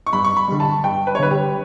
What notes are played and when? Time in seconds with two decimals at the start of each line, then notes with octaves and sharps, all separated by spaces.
0.06 C#6
0.13 G2 B5
0.24 C#6
0.37 B5
0.48 D3 G3
0.60 A5
0.84 G2 G5
1.07 B4
1.15 C#5
1.19 D3 G3 B4
1.30 G4